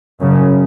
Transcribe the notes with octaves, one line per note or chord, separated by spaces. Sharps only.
F#2 C#3